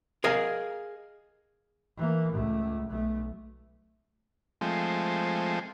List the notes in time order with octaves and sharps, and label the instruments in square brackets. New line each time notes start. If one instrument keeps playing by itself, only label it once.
[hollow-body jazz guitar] G#4 A#4 D#5 F5
[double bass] E3 A#3
C#2 A3
B1 A3
[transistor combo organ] F3 G#3 A3 C4